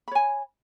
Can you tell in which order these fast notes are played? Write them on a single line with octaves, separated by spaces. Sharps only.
B5 C#5 G#5